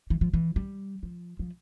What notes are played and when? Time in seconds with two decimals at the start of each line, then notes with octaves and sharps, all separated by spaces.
0.10 E3
0.21 F3
0.34 E3
0.56 G3
1.03 F3
1.39 F3